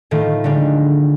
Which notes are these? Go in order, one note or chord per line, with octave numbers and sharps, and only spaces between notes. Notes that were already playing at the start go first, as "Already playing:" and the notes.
A2 D#3 A3 F4
D3 D#3 G3 G#3